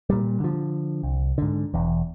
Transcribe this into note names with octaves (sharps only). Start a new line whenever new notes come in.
A#2 G3
D3 F3
C2
G#2 D3
E1 E2